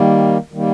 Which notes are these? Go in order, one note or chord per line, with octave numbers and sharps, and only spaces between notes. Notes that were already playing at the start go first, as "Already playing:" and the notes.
Already playing: D#3 G3 A#3
D#3 G3 A#3